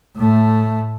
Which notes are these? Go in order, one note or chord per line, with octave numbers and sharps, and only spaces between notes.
A2 A3